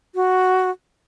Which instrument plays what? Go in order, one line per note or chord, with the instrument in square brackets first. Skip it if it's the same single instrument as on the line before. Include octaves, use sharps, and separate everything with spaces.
[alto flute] F#4